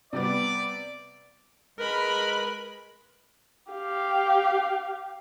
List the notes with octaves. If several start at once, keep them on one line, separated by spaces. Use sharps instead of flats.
C3 G3 B3 D5
G#3 A#4 B4 B5
G4 F5